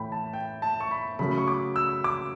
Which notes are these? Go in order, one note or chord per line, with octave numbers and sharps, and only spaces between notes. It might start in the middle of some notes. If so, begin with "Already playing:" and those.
Already playing: A2 E3 A3 G5 B5
A5
G5
A5
C#6
B5
C#3 F#3 A3 B5
C#6
D6
E6
D6